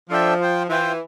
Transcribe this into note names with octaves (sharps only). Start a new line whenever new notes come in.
F3 D4 A4 E5 G5
F4 C5 G5
E3 F4 C5 G5